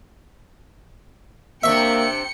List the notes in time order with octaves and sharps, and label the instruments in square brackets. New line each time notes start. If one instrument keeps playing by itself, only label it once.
[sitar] C3 D4 [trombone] A#3 [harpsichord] E5 C#6 [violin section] G5 C#7